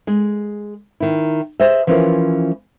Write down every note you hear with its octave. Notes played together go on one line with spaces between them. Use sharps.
G#3 G#4
D#3 E4
G#4 C5 D#5 E5
E3 F3 C#4 E4 F4 A#4